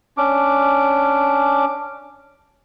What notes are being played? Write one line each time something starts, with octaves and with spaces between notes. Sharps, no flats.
C#4 D4 D6